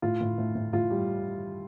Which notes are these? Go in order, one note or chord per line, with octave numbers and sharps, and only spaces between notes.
A2 F4
A2
A2
A2
A2 F4
G3